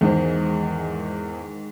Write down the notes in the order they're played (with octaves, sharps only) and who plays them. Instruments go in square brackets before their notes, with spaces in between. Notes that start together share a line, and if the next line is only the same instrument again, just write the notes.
[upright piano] E2 C5 [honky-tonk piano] G#2 D#3